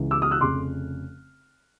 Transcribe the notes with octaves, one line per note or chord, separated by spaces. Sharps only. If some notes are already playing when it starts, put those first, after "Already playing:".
Already playing: C#2 C#3 E3
D6 E6
D#6 F6
E6 F#6
F1 F2 C#3 C6 D6